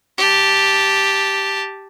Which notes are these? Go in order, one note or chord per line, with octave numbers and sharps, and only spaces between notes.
G4 A5